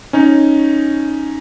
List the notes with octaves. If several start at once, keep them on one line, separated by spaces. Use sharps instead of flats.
C#4 D#4